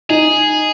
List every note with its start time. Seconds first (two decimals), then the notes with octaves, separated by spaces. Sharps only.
0.10 D#4 G#4